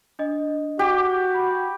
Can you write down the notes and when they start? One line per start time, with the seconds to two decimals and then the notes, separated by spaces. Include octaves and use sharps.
0.19 D4 D#5
0.79 F#4 G4 D6
1.34 B5